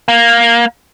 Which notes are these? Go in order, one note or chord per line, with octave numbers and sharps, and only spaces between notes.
A#3